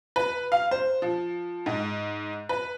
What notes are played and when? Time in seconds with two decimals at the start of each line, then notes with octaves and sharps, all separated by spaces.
0.16 B4
0.52 F5
0.71 C5
1.02 F3
1.66 G#2
2.49 B4